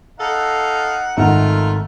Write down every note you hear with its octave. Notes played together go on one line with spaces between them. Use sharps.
D#4 A4 F5 F#5
G#1 D#3 A3 F4 F#5 A#5